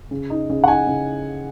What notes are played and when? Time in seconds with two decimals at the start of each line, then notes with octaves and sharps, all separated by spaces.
0.11 C#3
0.30 D#4
0.50 C#3
0.64 F#5
0.68 D#4 G#5
0.87 C#3